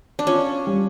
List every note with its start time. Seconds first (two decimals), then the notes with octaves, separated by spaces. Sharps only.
0.19 D4
0.27 C#4 F4
0.67 G3